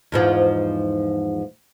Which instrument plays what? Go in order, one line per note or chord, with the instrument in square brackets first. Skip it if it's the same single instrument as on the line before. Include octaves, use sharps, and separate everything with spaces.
[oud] E2 G#2 F3